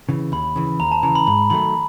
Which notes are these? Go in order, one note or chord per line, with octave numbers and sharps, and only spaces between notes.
C#3 E3
D#2 B5
C#3 E3
D#2 A#5
A5
C#3 E3 A#5
B5
G#2 B5
D#3 F#3 A3 B5